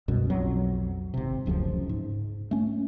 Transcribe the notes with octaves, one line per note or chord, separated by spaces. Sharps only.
C2 F#2 B2
B1 F2 B2 F#3
G#1 C3
D1 C#2 F#2 F3
G#2
A3 C#4